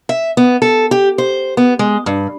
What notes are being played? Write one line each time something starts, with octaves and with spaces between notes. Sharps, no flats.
E5
B3
A4
G4
C5
B3
G#3
G2